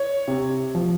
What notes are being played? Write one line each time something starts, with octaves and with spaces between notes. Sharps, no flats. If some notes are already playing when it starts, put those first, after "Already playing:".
Already playing: C#5
C3
F3